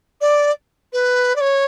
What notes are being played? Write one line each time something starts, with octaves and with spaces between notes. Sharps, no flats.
D5
B4
D5
C#5